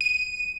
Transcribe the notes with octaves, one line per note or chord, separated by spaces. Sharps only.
D#7